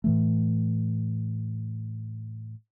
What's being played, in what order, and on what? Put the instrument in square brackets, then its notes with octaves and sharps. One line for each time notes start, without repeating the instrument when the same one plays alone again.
[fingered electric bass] A2 E3 A3